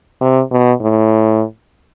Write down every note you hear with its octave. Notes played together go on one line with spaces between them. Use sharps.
C3
B2
A2